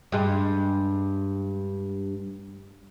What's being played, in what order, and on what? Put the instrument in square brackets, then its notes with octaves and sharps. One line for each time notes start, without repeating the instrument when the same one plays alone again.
[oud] G2 G#3